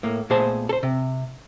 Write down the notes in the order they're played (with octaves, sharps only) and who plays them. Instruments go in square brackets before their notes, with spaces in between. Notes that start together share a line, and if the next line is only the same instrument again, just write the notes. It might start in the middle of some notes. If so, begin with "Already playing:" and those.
[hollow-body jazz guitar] A2 A#3
A#2 A3 B3 G#4 C5 A5
A4 C5
C3